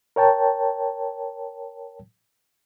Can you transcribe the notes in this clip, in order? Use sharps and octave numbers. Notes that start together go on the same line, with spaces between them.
A#4 C#5 G5 A5